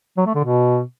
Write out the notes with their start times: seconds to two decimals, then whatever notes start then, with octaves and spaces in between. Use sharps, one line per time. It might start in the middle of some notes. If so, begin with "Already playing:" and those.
0.17 F#3
0.26 A3
0.35 D3
0.44 B2